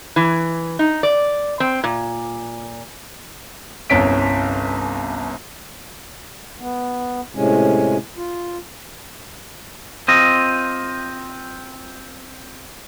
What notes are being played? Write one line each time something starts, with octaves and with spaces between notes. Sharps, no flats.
E3
D#4
D5
C4
A#2
G1 C2 C#4 B6 D7
B3
A2 C3 G#3 C#4
F4
C4 F4 D#5